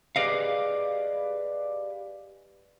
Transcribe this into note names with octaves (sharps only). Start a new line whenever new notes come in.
G4 G#4 B4 D5 D#5 F5